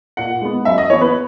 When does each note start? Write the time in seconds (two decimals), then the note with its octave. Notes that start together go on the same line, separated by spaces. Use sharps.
0.17 A#2 F#5
0.42 G#3 B3
0.65 F#2 E5
0.78 D#5
0.90 E3 B3 C#5
1.01 B4